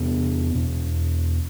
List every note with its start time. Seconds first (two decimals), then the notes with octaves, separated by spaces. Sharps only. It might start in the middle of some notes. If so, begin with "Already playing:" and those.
Already playing: E2 C3 B3
0.55 E2 B2